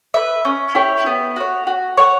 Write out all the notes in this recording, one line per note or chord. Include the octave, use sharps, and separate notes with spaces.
B4 E5
C#4
E4 G4 C#5
B3
F#4 C#5
F#4
C#5 F#5